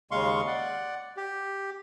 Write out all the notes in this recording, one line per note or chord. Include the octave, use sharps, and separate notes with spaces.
D#2 C#3 G#3 F5 C6 C#6
D5 F#5
G4